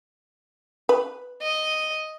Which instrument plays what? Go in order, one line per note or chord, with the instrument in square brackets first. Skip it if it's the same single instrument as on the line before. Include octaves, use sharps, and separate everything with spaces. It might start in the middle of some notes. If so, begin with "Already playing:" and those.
[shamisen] B4
[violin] D#5